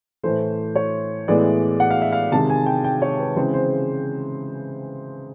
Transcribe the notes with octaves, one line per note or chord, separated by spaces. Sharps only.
A2 E3 A3 C5
C#5
A2 E3 G#3 B3 D5
F#5
F5
E5
F5
C3 D#3 G#3 A5
G#5
G5
G5
C#5
B4
C#3 E3 G#3 C4 C5
C5